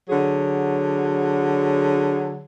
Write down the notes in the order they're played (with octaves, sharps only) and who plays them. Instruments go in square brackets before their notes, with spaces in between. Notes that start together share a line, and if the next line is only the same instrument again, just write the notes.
[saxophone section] D3 F#3 G#4